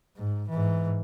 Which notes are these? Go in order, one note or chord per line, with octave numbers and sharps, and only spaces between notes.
G#2
G#2 E3